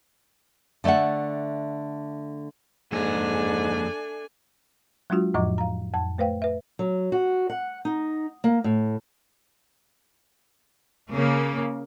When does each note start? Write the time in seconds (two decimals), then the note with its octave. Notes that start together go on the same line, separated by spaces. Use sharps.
0.84 D3 A3 D5 E5 F#5
2.92 F2 G#2 A3 A#3 D4 G#4 G#5
5.10 F#3 G#3 D4 F4 F#4
5.34 F2 A2 F3 D#5 C#6 D6
5.58 F5 A#5
5.94 F2 A5
6.18 A3 B4 C5 F5 G5
6.42 B4 E5
6.79 F#3
7.12 F#4
7.50 F#5
7.85 D#4
8.44 A#3
8.64 A2
11.12 C#3 A#3